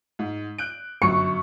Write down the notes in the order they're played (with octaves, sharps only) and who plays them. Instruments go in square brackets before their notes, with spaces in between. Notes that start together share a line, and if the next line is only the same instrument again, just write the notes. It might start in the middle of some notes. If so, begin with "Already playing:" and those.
[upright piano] G#2
F#6 G6 D7
[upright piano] G1 F#2 C#7 [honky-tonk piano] C#6